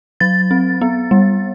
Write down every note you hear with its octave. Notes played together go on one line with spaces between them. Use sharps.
F#3 A6
C4
B3
G3